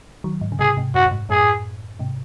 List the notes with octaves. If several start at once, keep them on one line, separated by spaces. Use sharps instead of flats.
D#3 F#3
G#2
C#3
G#2 C3 G#4
G#2 C3
F#2 F#4
F#2
G#2
F#2 A2 G#4
G#2 C3